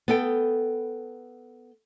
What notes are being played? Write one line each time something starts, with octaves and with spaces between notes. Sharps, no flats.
B3 A4 G5